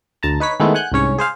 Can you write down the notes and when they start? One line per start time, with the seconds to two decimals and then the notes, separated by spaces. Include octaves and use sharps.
0.23 D2 A5 A#5
0.40 D#4 B4 C#5 B6
0.60 D#3 G#3 A3 B3 E4
0.75 F#5 G#5 F#6 G6
0.92 C2 G#2 C#4 C#5
1.18 G#4 C5 F5